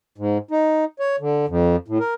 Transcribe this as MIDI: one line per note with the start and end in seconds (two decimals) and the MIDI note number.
0.18 0.38 44
0.51 0.85 63
0.99 1.16 73
1.20 1.46 50
1.49 1.76 41
1.88 1.98 45
2.00 2.14 70